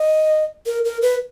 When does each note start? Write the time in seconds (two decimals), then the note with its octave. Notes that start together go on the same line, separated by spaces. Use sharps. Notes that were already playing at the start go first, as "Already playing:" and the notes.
Already playing: D#5
0.66 A#4
0.85 A#4
1.02 B4